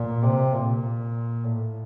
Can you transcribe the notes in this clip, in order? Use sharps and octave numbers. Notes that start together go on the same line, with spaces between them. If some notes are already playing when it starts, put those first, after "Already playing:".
Already playing: A#2
C3
A#2
A2